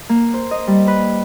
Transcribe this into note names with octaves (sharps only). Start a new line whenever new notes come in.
A#3
C5
D#5
G3
B4